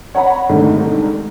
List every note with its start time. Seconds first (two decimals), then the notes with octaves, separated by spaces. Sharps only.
0.15 C#5 F#5 A#5 B5
0.49 C2 G#2 D3 D#3 G3 A3